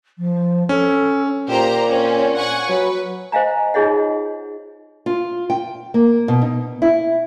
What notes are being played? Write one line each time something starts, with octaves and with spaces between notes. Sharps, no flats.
F3
C#4 A4
A#2 G4 C5 A#5
C4 C#4
F#5 G#5 C#6
F#3 B4
C5 D#5 F5 G#5 A#5
D#4 F4 G#4 C#5 D#5 F#5
F4
G5
A#3
B2
D#4
E4